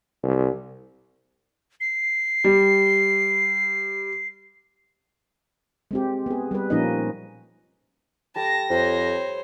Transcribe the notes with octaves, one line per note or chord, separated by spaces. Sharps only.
C2
C7
G3
G#3 C4 G4
B3 G#4
G3 B4
A#2 F3 A#3 C#4 D#4 D#5
G3 A4 G5 A5 A#6
F2 C5 C#5